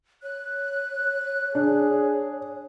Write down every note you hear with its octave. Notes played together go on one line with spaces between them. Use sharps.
C#5 F#6
D4 G#4